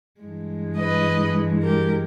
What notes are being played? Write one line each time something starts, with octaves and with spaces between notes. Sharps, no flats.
G2 E3 G#3
B4 D#5
G4 A#4